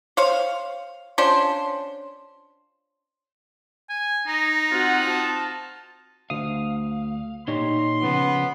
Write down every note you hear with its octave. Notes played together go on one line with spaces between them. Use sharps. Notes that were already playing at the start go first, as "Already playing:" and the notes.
C5 C#5 F5
F3 C#4 D4 C5
G#5
D#4 A#5
C4 F4 F#4 F#5
A5
D2 F5 D#6
A#2 D#4 G4 C#5 C6
C#3 F3 B3